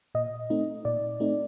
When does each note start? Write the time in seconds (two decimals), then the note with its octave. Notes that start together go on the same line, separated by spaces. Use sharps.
0.15 A#2 D#5
0.50 A3 C4 D#4
0.85 A#2 D5
1.20 A3 C4 D#4